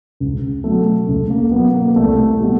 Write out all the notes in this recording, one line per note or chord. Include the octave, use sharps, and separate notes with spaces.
C#2
B2 F#3 A3
C#2 A3
A#3
B2 F#3 B3
A#3
C2 A3
B2 G3